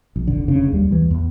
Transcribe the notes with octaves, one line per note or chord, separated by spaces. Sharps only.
A#1
F1 D3
F1 C#3 D4
D#2 G3
D#2 E3
E2